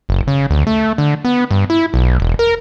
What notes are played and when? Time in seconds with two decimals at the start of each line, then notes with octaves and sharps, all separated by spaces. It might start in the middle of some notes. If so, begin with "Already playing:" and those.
0.09 F#1
0.27 C#3
0.50 D2
0.67 A3
0.98 D3
1.25 B3
1.51 G2
1.70 E4
1.94 B1
2.20 E1
2.39 A#4